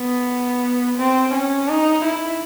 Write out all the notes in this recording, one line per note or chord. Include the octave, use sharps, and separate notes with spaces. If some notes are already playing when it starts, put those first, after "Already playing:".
Already playing: B3
C4
C#4
D#4
E4